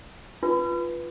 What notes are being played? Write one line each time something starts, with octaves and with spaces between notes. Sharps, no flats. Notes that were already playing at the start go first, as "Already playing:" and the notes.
F4 B4